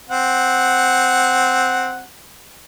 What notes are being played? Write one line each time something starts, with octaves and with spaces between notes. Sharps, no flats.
C4 F#5